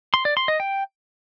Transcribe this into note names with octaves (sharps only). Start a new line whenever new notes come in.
C6
D5
C6
D#5
G5